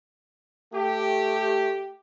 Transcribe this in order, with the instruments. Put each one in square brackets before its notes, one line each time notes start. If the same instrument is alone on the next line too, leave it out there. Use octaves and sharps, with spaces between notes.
[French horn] A3 [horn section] G4